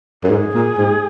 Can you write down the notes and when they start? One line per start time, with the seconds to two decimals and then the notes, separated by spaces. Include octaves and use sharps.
0.24 F#2
0.30 G#2 G#4
0.55 A#2
0.78 G#2